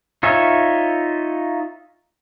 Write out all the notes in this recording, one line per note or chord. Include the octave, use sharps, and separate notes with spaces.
D#4 F4 C#5 E5 G#5